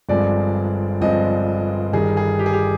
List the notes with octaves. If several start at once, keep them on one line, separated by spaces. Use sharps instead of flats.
G1 G2 F3 G#3 C4 D5
G1 G2 F3 G#3 C4 D#5
G1 G2 D#3 G3 G#4
G#4
G4
G#4
G4